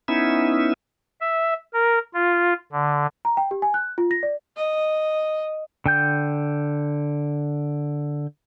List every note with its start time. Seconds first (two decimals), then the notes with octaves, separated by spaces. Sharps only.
0.08 B3 C#4 D#4 E4 E5
1.21 E5
1.73 A#4
2.14 F4
2.72 D3
3.25 A#5
3.37 G5
3.51 G4
3.62 G#5
3.74 F#6
3.98 F4
4.11 A#6
4.23 D5
4.56 D#5
5.86 D3 G5 G6